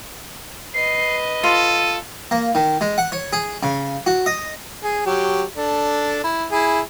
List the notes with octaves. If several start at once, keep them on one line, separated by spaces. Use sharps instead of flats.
B4 D#5 C7
F4 A4 D#7
A#3
D#3
G#3
F#5
C#5
G#4
C#3
F#4
D#5
G#4
F#3 G4
D4 A4
E4
E4 G#4